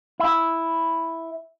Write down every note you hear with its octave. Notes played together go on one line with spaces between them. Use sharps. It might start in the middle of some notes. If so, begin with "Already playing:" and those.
E4